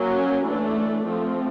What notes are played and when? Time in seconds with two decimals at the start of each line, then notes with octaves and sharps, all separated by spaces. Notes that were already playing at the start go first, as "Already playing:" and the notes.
Already playing: F#3 A#3 C#4
0.45 E3 A3 D4
1.05 F3 A3 C4